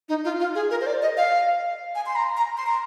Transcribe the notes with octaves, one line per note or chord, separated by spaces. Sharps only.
D#4
F4
F4
G#4
A#4
C5
D5
D#5
F5
G#5
C6
A#5
A#5
C6
A#5